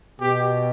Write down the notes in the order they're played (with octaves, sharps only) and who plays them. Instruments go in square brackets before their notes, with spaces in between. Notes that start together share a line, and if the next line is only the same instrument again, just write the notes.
[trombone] B2 [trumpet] G4